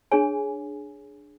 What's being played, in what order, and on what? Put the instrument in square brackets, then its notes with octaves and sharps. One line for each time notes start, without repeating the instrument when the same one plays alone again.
[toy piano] D4 G#4 C#5 G#5